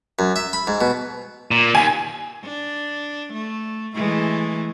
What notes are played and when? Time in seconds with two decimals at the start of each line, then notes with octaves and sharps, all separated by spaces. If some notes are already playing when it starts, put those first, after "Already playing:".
0.19 F#2
0.36 E5
0.53 B5
0.67 G#2
0.81 B2
1.51 A#2
1.75 D#2 G#5
2.44 D4
3.33 A3
3.94 E3 G#3 A3